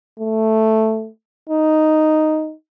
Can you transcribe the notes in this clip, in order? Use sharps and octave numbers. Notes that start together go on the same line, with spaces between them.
A3
D#4